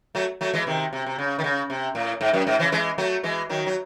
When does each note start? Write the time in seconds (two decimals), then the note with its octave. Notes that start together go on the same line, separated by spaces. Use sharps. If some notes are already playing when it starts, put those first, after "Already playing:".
0.15 F#3 A3
0.41 F#3 A3
0.54 E3 G#3
0.67 C3 D#3
0.93 C3
1.06 C3
1.18 C#3
1.39 D#3
1.44 C#3
1.70 C3
1.95 A2
2.21 G#2
2.34 F#2
2.47 G#2
2.59 C#3 E3
2.72 E3 G#3
2.98 F#3 A3
3.23 E3 G#3
3.49 D#3 F#3
3.67 F#3